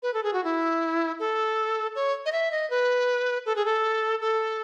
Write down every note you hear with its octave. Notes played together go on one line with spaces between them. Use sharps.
B4
A4
G#4
F#4
E4
A4
C#5
D#5
E5
D#5
B4
A4
G#4
A4
A4